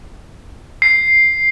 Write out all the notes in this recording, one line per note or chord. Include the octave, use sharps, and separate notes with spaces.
C7